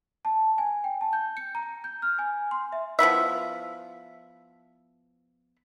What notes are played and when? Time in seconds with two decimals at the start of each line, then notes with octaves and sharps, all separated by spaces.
0.25 A5
0.58 G#5
0.84 G5
1.01 A5
1.13 G6
1.37 C#7
1.55 A#5
1.84 G6
2.02 F6
2.19 G#5
2.51 C6
2.72 E5
2.99 F3 B3 E4 E5